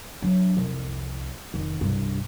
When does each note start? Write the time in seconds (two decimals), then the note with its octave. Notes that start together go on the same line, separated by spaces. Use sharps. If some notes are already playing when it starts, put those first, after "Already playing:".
0.22 F#3 D4
0.57 C2 F2
1.54 F1 D#3
1.81 C2 G2